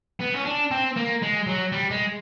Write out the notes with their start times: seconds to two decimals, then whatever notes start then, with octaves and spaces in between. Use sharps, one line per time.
0.20 B3
0.35 C#4
0.45 D4
0.71 C4
0.96 A#3
1.22 G#3
1.47 F#3
1.72 G3
1.91 G#3